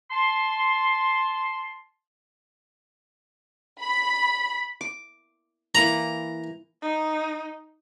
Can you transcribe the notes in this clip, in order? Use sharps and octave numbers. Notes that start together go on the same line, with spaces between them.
A5 C6
B5
D6
E3 A#3 A#5 B5
D#4